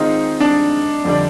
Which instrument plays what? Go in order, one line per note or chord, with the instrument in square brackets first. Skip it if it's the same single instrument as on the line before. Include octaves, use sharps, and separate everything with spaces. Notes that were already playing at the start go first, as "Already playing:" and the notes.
Already playing: [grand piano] D#3 G#3 C4 F4 G#4 [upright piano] D#4
[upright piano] D4
[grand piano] F2 D3 G3 D4